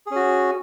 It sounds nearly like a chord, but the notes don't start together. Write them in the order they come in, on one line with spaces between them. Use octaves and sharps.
G#4 C#4 F#4